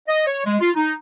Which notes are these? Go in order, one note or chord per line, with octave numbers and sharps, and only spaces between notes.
D#5
C#5
G#3
F4
D#4